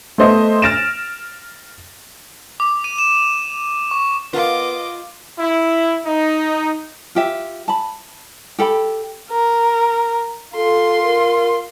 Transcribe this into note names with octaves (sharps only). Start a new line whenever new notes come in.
A3 B3 C5 D#5 E5
F6 A6 A#6 D7 E7
D6
D#7
E7
C#6
B3 F4 A#4 D#5 F5 D6
E4
D#4
F4 G4 E5
A5 B5
G4 A4 G5 B5
A#4
F4 A4 C6
A#4